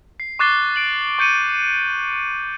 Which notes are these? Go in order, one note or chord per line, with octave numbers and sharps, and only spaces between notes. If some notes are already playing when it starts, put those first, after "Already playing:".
C7
C#6 D6 F#6 A6 C7 G7
D7 F#7
C#6 G6 C#7 D#7